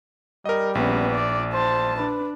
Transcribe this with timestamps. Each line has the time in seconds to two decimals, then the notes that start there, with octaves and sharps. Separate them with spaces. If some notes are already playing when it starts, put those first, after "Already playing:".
0.45 G3 A#4 D#5
0.75 A#1 B3 C#4
1.11 D5
1.54 C5 A5
1.97 D4 B4